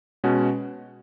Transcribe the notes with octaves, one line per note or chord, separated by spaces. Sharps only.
B2 G#3 C#4 F#4